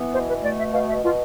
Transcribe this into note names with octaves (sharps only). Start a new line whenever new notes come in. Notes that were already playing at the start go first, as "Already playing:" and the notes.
Already playing: E3 B3
B2 C5
B4
A3 D5
E5
B2 F5
E5
B2 F4